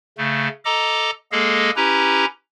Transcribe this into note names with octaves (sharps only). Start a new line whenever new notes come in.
C#3 A3
A4 D#5 A#5 D6
G#3 A#3 G#4 A4 D#5 F5
C#4 E4 G4 B4 A#5